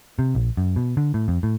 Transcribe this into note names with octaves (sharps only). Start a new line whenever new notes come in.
C3
A#1
F#2
B2
D3
A2
F2
A2